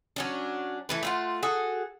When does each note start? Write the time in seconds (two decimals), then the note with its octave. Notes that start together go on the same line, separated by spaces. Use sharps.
0.16 F#3 C#4 D4
0.89 E3 A3 B4
1.03 A3 F4 F#5
1.43 F#4 G#4 A4